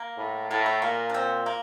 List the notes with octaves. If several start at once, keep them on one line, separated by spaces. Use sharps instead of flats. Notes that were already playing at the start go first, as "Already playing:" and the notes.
Already playing: A#3
A2
A2 A#3
A3
A#2 A#3
D4
C4
A#3